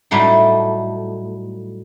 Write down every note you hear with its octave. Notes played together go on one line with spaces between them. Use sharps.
A2 F#3 G3 A3 D#4